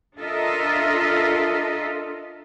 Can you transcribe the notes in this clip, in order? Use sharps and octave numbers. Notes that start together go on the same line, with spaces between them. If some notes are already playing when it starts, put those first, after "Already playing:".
D4 F4 A4 A#4 D#5 E5